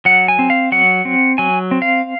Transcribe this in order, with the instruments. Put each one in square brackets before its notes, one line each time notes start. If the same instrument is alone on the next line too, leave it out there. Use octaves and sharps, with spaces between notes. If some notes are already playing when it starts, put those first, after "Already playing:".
[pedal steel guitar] F#3 F#5
G#5
C4
F5
F#3 F#5
C4
F#3 G#5
C4
F5